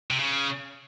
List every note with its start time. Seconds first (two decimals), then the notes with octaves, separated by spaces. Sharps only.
0.11 C3
0.19 C#3